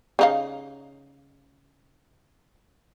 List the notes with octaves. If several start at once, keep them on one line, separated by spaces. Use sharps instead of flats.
C#3 D#4 F5